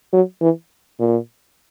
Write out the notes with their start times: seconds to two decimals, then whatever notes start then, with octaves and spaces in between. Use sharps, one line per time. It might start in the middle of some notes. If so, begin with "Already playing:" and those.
0.13 F#3
0.41 E3
0.99 A#2